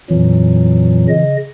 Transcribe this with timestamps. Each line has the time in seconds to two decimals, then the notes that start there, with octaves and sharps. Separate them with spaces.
0.10 F2 A#2 E3 F#3
1.08 C#3 D#5